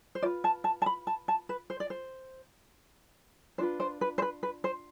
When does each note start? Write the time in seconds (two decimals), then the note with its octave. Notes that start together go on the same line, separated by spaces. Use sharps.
0.15 C5
0.22 F4 B4 D5
0.44 A5
0.64 A5
0.82 A5
0.86 B5
1.07 A5
1.28 A5
1.49 B4
1.70 C5
1.80 D5
1.90 C5
3.58 D4 F4 B4 C5
3.80 C5
4.01 B4
4.18 C5
4.22 B4
4.43 B4
4.64 C5